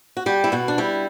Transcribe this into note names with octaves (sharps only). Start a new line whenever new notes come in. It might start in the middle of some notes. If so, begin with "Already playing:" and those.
F#4
G3 G4
E4
B2 F#4
D4
G3 E4